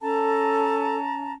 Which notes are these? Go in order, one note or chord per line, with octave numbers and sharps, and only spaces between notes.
C#4 A4 A5 A#5